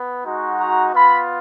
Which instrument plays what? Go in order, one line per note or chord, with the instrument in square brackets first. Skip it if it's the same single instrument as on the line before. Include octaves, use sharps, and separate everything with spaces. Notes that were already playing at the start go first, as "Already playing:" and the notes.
Already playing: [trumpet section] B3
G#3 D#4 F#4
A#5
B3 F4 B5